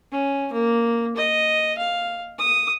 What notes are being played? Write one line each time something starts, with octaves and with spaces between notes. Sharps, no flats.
C#4
A#3
D#5
F5
D#6